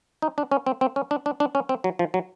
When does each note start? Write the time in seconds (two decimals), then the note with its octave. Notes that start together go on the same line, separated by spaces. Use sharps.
0.22 D#4
0.38 D4
0.51 C#4
0.66 C4
0.81 C4
0.96 C#4
1.11 D4
1.26 D4
1.40 D4
1.55 C#4
1.69 C4
1.84 F#3
1.99 F3
2.14 F#3